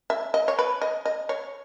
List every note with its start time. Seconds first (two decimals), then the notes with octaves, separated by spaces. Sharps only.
0.10 E5
0.34 D#5
0.48 C#5
0.59 B4
0.81 D#5
1.05 D#5
1.29 C#5